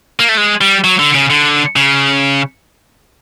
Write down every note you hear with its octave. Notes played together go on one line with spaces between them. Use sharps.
A#3
A3
G#3
G3
F#3
D3
C#3
D3
C#3